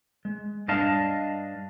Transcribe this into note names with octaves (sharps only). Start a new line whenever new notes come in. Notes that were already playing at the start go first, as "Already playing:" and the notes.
G#3
G2 D4 D#5 F5 A5